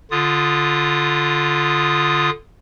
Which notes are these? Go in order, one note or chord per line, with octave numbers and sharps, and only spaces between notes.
D3 F4 D#6